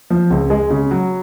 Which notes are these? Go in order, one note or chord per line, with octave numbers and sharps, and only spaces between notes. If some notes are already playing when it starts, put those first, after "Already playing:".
F3
C#2
G#3
C#3
F#3